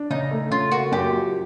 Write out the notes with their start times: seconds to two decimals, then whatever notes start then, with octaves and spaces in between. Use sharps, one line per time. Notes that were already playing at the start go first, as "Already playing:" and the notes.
Already playing: D4
0.10 C#3 D#4
0.31 A3
0.51 C#3 F4
0.71 A#3 F#4
0.92 F#2 G4
1.13 F3